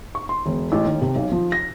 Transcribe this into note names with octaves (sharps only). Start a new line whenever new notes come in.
C#6
C6
E1
A1
D#2
C3
B1
F3
A#6